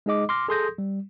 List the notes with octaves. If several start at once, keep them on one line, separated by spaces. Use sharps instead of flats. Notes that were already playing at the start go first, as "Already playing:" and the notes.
G#3 D#4 G#4 D#5 D6
C6 D6 F6 A#6
G#4 A4 C6 D#6 G6 A#6
G3